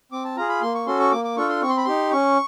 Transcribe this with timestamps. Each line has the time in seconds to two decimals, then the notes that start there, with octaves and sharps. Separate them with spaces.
0.12 C4 D6
0.25 A5
0.37 F4 G#4 A#5
0.49 B5
0.62 A#3 C6
0.75 C#6
0.87 C#4 F#4 A4 C6
1.00 C#6
1.12 A#3 D6
1.25 D6
1.37 D4 F4 A4 C#6
1.49 C6
1.62 C4 C#6
1.69 C6
1.77 B5
1.85 D#4 G4 C6
2.12 C#4 C#6